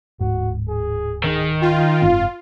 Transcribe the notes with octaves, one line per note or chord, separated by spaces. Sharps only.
D1 G#2 F#4
G#4
D#3 G#4
F4 G5
F#1 G#2 C4 F5